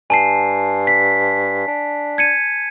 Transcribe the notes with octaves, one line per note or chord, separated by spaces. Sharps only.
G2 G#5 A5 C7
B6
D4
G#6 C#7 D#7